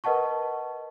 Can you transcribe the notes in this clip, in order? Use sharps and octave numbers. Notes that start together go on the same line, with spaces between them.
A#4 B4 D#5 F#5 A5 C#6